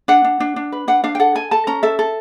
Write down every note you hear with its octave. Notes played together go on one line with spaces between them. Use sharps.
D4 F#5
D4
D4
D4
B4
D4 F#5
D4 F5
G5
A4 F#5
A4 G#5
A4 A5
C#4 A#5
A4 E5
A4